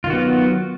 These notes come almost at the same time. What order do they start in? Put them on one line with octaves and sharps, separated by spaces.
F4 D#3 F#4 B3 F#3